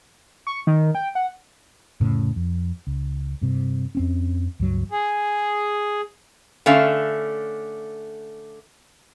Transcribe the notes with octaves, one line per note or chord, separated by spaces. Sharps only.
C#6
D#3
G5
F#5
F1 A2 C#3
F2
C#2
G2 C3
F2 C4 C#4
C#2 G2 F#3
G#4
D3 A3 C#4 F5